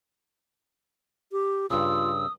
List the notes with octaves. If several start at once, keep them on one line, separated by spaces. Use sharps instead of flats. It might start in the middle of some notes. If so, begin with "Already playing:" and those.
G4
G2 C#3 F4 D#6 E6